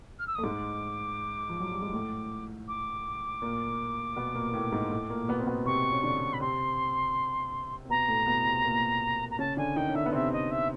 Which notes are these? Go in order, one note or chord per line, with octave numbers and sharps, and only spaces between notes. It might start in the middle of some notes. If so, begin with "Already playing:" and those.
F6
E6
D#6
A3
G#2 G#3 D6
F3
F#3
G3
G#3
A2 A3
D6
A#2 A#3
B2 B3
A#2 A#3
A#3
A2 A3
G#2 G#3
A2 A3
A#2 A#3
B2 B3
C4
B2 B3
C3 C4 C#6
C#4
D3 D4
B5
C3 C4 C6
C4
B2 B3 A#5
A2 A3
B2 B3
C3 C4
A#2 A#3
A#5
C#3 C#4 A5
D3 D4 G#5
D#3 D#4 G5
C#4
D3 D4 E5
B3
C3 C4 E5
D#5
E5